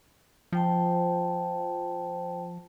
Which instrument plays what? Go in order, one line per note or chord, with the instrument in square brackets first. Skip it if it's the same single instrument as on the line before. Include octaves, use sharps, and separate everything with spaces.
[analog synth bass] F3 [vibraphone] C5 G5 A5